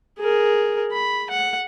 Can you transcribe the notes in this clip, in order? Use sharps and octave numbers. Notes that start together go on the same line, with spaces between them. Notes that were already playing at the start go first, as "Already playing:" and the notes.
G#4 A#4
B5
F#5